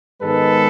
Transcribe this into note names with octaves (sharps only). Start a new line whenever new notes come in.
G#2 D#3 G#3 B3 A4 B4